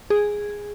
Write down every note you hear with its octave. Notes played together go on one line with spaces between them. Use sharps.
G#4